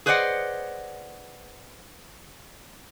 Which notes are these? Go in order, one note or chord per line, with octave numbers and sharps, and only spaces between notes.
G#4 B4 C5 D5 D#5 F#5